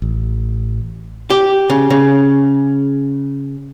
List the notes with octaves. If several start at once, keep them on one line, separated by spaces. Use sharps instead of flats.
A1
G4
C#3
C#3